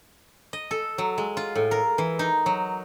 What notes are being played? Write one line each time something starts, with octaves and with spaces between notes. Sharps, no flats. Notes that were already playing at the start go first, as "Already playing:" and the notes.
D#5
A4
F#3
G#3
F4
A2
A#4
E3
D#4
F#3